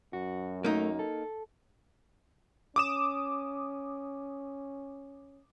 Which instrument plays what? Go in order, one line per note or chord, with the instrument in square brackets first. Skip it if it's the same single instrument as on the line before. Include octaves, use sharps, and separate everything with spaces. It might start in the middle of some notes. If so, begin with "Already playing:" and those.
[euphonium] F#2 [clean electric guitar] F#4
[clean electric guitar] A3 [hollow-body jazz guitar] A#3 D#4
[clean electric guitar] A4
[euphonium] C#4 [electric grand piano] D6 D#6 E7